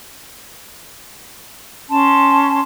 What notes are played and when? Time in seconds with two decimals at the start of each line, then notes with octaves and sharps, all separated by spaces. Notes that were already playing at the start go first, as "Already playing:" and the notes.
1.89 C#4 A5 C6